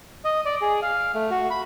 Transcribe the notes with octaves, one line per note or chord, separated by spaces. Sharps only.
D#5
D5
G#4
F5
A3
F#4
B5